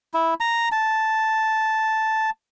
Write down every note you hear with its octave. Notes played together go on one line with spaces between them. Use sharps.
E4
A#5
A5